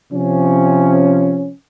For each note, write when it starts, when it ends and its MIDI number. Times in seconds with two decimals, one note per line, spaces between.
0.13 1.52 48
0.13 1.52 53
0.13 1.52 61